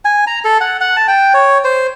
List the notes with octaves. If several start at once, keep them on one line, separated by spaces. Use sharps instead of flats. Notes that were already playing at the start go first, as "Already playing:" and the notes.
G#5
A#5
A4
F#5
F#5
A5
G5
C#5
C5